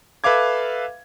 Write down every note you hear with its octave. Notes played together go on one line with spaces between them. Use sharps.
A4 B4 E5 F5 D6 G#6